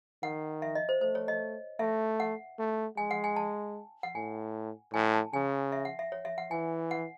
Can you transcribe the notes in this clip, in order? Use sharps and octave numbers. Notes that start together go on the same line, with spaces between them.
D#3 F#5
E5
D#5
C5
A3 C5
C#5
D#5
A3 E5
F#5
A3
G#3 G#5
F#5
G#5
A5
F#5
A2 G#5
A2 G#5
A5
C#3 G#5
E5
F#5
E5
C#5
E5
F#5
E3 G#5
F#5